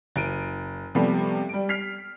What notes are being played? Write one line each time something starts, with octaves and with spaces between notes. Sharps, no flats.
F#1 D7 D#7
C3 F3 G3 A3 B3
G3 D7
F6 B6 C7 F7